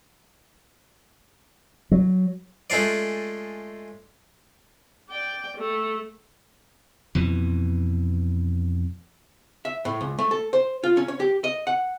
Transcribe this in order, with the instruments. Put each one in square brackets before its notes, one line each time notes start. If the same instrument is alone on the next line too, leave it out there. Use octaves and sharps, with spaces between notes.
[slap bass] F#3
[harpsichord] G#3 A3 C#4 F4 D5
[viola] D5 G5
A3
[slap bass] F2 B2 E3
[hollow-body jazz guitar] E5
A2
C#2
A3
A4
C5
F4
C#4
C#5
G4
D#5
F#5